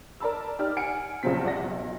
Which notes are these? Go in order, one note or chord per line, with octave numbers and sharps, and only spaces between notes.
A#4 D5 A5 B5 E6
D#4 G4 D5 F6
F#5 G#5 C#7 D7
A#1 C#3 F3 F#3 C4 B6
C2 D5 F#5 A#6
B1